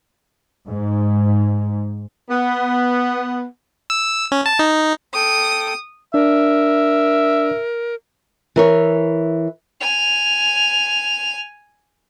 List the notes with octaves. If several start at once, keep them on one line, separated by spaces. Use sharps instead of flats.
G#2
B3
E6
C#4
A5
D#4
A4 G5 D#6
D4 A#4 D5 E5
E3 A#4 C#5
G#5 F7